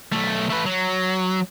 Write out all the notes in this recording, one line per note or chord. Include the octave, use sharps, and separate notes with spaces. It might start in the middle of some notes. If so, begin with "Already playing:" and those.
B1 A3
A3 B4
F#3